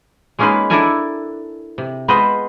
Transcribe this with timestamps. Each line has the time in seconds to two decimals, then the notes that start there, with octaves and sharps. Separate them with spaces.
0.39 G#3 A#3 C#4 D#4 F4 B4
0.70 D4 E4 A4 A#4 G#5
1.78 C3
2.08 G#3 B3 F4 B4 C5 D#5